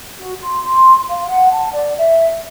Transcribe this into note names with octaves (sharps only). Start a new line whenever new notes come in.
F#4
C6
C6
F5
F#5
A5
D5
E5